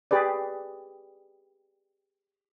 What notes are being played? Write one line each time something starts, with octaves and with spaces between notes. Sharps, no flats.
G4 G#4 B4 D5